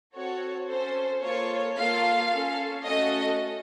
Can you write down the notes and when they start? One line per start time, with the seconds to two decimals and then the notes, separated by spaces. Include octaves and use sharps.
0.14 C4 F#4 A4 C#5
0.68 C#4 A4 C5
1.22 A#3 F4 A4 C#5
1.77 A#3 F4 A4 F5
2.31 C#4 A4
2.86 A3 C#4 F#4 A4 D#5